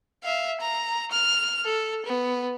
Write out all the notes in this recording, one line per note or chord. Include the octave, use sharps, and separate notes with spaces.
E5 F5
A#5
F6
A4
B3